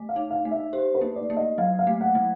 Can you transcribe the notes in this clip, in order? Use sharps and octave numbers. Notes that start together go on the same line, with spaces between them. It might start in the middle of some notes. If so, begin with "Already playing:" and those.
Already playing: A3
F5
D#4
F5
A3
E5
G4 C5
B4
A#3
D5
A#3
D#5
F#3 F5
F5
A3
F#5
F#3